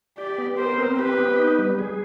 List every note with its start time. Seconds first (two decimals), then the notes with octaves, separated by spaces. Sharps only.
0.18 G4 D5
0.38 B3
0.58 A#4 C5
0.78 C4
0.98 G4 B4
1.19 B3
1.38 D#4
1.59 G3
1.79 G#4